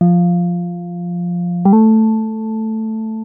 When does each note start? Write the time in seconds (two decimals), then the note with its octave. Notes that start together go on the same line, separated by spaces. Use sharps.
0.01 F3
1.65 G3
1.73 A3